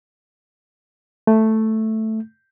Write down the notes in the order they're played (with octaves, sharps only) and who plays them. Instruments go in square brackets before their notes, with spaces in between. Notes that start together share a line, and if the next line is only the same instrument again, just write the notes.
[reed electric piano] A3